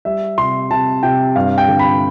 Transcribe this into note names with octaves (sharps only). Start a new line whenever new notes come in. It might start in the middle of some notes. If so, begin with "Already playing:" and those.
G3 E5
C3 C6
C3 A5
C3 G5
G2 F5
G5
D3
B5